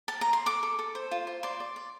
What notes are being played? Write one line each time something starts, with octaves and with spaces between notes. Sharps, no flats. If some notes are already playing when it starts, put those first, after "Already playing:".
A5
A#5
C6
A4 D6
A4
A4
C5
F4
C5
D5 C6
D5
D5